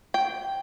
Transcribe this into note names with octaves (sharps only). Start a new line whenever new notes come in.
G5